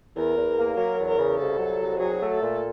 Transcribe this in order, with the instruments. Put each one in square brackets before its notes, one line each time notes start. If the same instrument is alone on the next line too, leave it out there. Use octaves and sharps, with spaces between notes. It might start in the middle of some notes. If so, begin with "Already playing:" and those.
[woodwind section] E2 [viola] A#4
[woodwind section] E2
A#3
[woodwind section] F#3 [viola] A#4
[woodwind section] E2
[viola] A#4
[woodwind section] C#3
[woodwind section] C2 [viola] A4
[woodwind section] F#3
C2
[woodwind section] F#3 [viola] G#4
[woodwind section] A3
[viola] A4
[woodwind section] A#2